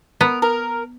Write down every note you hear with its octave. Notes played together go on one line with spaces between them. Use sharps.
B3 A#4
A#4